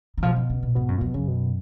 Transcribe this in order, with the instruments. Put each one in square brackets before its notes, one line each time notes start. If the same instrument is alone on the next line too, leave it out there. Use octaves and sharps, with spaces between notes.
[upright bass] D#3
[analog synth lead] B2 [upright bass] F3
[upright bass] D#3
C#3
A#2
[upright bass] G#2 [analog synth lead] B2
[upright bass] F#2
[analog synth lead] A#2
[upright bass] F2 [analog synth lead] B2
[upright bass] F#2 [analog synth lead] C#3
[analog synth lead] B2